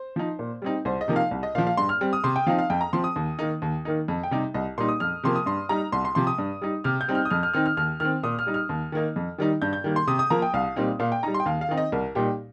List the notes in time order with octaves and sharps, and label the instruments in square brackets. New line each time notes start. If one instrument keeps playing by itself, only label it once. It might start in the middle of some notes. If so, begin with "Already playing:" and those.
Already playing: [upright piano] C5
F3 D#4
A#2
G3 C4 D#4
C2 C5
D#5
C3 F3 A#3 D#4
F5
C2
D#5
A#2 F5
F3
F5
G2 C6
F6
G3 C4
D#6
C3 C6
G5
F3 C4 D#4 F5
F5
F2 G5
A#5
F3 C4 C6
D#6
D#2
D#3 A#3 D#4
D#2
D#3 A#3 D#4
F2
G5
C3 G3 D#4
C2 D#5
A#2 G3 D#4 C6
D#6
F2 F6
C3 F3 A#3 C6
D#6
G2 C6
G3 D#4 A#5
C2 C6
C6
C3 F3 C6
D#6
G2
G3 D#4
C3 F6
G6
G3 C4 D#4
F6
D#6
F2 F6
F6
D#3 C4 D#4 F6
F6
D#2 F6
D#3 C4 F6
A#2 D#6
F6
G3 D#4
F6
D#2
D#3 A#3 D#4
F2
D#3 G3 D#4
G2 G6
G6
D#3 G3 A#3
C6
C3 D#6
D#6
F3 A#3 A#5
G5
C2 F5
A#2 G3 C4 D#4
A#2 F5
G5
G3 D#4 A#5
C6
G5
D#2 F5
F5
D#3 C4 D#4
D#5
C2 A#4
A#2 G3 D#4 G4